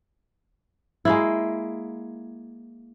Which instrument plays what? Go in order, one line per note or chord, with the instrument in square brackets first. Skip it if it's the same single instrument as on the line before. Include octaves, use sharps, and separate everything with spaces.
[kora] G#3 A#3 E4